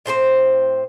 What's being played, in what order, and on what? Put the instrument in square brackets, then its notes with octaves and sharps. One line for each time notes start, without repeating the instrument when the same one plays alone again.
[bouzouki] A2 C4 G#4 C5